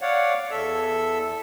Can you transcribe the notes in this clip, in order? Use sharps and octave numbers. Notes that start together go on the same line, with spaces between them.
C#5 D5 F5 F#5
E2 A4 E5 E6